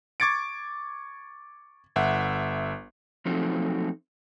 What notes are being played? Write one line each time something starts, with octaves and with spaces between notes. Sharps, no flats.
C#6 D6 G#6 A6 C#7 D7
G1 E5 F#5
F3 F#3 A3 C4 D#4